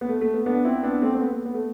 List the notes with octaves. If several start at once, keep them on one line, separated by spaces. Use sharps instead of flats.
B3
A3
A3
B3
B3 D4
C4 E4
B3 D4
A3 C4
C4
B3
B3
B3
A3